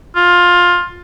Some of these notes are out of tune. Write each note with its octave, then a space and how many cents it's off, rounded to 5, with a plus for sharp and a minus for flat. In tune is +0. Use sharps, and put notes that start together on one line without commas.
F4 +15